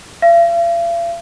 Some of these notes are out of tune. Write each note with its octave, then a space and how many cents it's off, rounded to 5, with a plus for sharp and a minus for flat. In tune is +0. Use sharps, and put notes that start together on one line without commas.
F5 -45